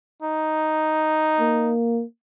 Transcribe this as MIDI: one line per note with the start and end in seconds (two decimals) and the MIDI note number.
0.22 1.73 63
1.40 2.04 58